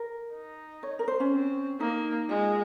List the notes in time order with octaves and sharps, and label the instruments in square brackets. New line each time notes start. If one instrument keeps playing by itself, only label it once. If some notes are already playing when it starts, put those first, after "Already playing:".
Already playing: [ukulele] A#4
[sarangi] D#4
[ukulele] C#5
A#4
C5
C#4
[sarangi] C4
[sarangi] A#3 [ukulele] D#4
[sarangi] G#3 [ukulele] F4